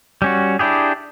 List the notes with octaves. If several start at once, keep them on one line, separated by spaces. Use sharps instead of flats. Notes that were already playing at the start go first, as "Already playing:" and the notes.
G3 C#4 F#4
D4 E4 G4 G#4